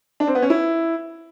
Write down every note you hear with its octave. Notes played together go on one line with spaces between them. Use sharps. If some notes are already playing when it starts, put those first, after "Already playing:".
D4
C4
B3
C#4
E4